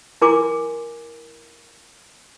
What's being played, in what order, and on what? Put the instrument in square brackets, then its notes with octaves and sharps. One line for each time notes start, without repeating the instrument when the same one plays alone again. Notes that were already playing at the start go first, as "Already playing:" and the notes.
[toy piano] E4 A#4 G#5 C6 D6